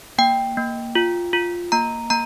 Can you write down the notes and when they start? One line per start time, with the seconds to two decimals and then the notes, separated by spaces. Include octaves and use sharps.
0.18 A#3 G5
0.57 A#3
0.95 F4
1.33 F4
1.72 A#3 A#5
2.10 A#3 A#5